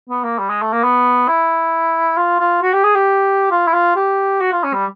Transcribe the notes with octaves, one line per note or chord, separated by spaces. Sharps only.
B3
A#3
G3
G#3
A3
A#3
B3
E4
F4
F4
F#4
G4
G#4
G4
F4
E4
F4
G4
F#4
F4
C#4
G3